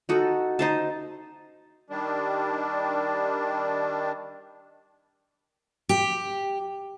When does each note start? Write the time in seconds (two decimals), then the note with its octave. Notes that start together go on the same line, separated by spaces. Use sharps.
0.09 D#4 F#4 A4
0.59 D#4 C5 A5
1.90 D#3 G3 D4
5.89 G4